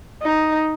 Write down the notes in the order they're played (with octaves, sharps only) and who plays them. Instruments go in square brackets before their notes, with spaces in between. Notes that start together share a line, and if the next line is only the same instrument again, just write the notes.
[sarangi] D#4